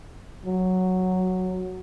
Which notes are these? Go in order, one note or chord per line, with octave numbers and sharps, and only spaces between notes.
F#3